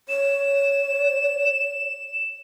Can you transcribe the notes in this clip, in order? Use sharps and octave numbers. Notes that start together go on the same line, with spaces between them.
C#5 E7